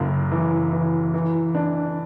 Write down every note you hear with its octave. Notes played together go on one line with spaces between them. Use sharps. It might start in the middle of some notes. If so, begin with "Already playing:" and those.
Already playing: F#1 F#2
E3
E3
E3
D4